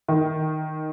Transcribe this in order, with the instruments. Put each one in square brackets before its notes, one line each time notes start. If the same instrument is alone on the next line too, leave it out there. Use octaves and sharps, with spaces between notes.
[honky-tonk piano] D#3